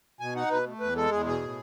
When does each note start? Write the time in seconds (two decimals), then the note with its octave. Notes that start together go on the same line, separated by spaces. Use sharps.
0.20 B2 G#5
0.35 D#4 F#5
0.50 B2 B4
0.66 A3
0.80 E2 B4
0.96 G#3 A4
1.11 E2 G#4
1.26 B2 G#4
1.41 A2